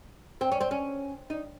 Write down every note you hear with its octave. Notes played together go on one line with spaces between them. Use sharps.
C4
C#4
C4
C#4
D#4